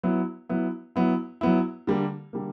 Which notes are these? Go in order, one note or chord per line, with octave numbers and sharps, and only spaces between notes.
F#3 B3 E4
F#3 B3 E4
F#3 B3 E4
F#3 B3 E4
D3 G3 A#3
D3 G3 A#3